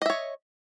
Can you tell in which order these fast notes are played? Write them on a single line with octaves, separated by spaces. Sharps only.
D#5 E5 C#5